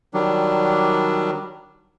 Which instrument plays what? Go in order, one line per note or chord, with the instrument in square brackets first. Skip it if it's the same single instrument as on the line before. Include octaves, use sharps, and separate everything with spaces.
[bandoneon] D#3 F#3 G3 D4